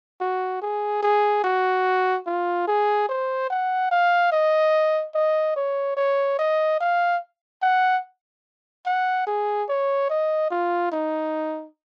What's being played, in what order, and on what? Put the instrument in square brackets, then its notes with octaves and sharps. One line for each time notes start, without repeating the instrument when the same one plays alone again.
[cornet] F#4
G#4
G#4
F#4
F4
G#4
C5
F#5
F5
D#5
D#5
C#5
C#5
D#5
F5
F#5
F#5
G#4
C#5
D#5
F4
D#4